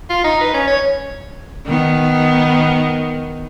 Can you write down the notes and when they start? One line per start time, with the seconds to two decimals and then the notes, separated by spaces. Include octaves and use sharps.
0.10 F4
0.24 D#4
0.41 B4
0.54 C#4
0.68 C#5
1.66 D#3 B3